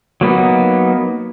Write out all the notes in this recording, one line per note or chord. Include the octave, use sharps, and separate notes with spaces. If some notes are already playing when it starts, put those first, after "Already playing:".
F#3 A#3 B3 D#4